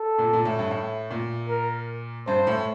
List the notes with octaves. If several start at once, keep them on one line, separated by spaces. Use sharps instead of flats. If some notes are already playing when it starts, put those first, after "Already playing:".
Already playing: A4
A#2
A#2
A2
G2
A2
A#2
A#4
G2 C5
A2